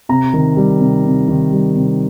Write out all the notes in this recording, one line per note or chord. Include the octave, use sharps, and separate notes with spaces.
C3 A#5
D#3
G3
C3
C3
D#3
G3
C3